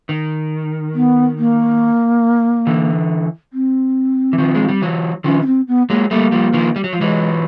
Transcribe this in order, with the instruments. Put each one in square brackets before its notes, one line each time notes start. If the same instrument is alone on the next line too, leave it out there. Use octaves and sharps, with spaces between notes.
[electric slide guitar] D#3
[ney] B3
A#3
[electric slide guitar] D3 E3
[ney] C4
[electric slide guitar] E3
D#3 F3
G#3
G3
E3 F#3
[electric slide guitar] D#3 F3 [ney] C#4
[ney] C#4
C4
B3
[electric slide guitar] F#3 G#3 [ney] A#3
[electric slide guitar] G3 A3 [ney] A#3
[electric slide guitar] F3 G3
D#3 F3
G3
F#3
F3
[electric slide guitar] E3 F#3 [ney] G#3